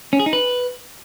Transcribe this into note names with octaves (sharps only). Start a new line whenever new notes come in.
C#4
G#4
D#4
B4